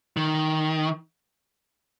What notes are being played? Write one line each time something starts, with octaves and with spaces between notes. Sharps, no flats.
D#3